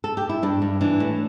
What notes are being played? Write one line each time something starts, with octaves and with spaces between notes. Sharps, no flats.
A4
G4
E4
G2 D4
G2
E3 D4
A2